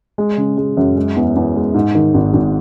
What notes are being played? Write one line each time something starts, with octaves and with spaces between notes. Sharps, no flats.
G#3
C#3
G#3
F#2
G#3
E2
E2
G#3
G#2
D#3
G#1
G#1